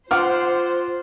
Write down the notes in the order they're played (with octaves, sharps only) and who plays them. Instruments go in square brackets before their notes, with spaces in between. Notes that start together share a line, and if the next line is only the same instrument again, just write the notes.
[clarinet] F4 [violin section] C5 [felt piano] F#5 D6 F6